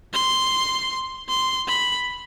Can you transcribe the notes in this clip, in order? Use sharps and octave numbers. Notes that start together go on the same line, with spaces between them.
C6
C6
B5